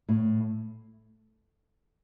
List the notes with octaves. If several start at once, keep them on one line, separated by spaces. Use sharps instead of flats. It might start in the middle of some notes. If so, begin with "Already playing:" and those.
A2